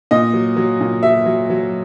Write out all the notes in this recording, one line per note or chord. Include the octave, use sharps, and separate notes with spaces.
A#2 D#5
F#3
F#3
A#2
F#3 E5
F#3
F#3